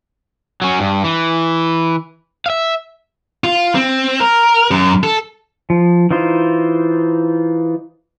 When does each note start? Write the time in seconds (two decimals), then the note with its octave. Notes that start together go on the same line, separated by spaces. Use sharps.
0.62 F#3 C#4
0.80 G2
1.04 E3
2.46 E5 F5
3.44 F4
3.75 C4
4.20 A#4
4.71 F#2
5.03 A4
5.70 F3
6.11 E3 D#4 F4 C5